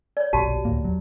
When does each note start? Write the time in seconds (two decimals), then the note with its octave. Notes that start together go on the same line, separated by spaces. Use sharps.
0.17 C#5 D5
0.33 F#1 B1 A#2 F#4 G4 A5
0.65 D2 A2 A#3
0.85 E2 F#3